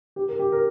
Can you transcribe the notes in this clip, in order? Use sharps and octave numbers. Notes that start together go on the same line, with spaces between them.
G4
A#4
G4
A#4